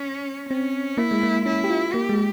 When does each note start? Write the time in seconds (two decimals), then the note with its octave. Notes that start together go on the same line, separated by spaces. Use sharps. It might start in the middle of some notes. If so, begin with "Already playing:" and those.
Already playing: C#4
0.50 C4 C#4
0.97 A#3 E4
1.11 G#3
1.23 A#3
1.46 C#4 E4
1.64 G4
1.69 F4
1.93 A#3 G4
2.09 G#3